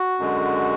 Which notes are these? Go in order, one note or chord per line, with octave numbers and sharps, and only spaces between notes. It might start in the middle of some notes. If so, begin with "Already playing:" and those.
Already playing: F#4
F#2 D3 G#3